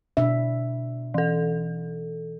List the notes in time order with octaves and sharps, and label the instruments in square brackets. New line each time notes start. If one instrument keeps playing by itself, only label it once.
[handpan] B2 D4 E5
[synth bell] E3 A4